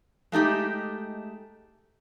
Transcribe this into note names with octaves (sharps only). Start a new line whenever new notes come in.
G#3 A3 D#4 G4